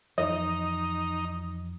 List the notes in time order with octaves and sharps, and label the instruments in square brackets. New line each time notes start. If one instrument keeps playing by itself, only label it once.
[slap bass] F2 E3 [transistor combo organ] D#4 [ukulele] D#5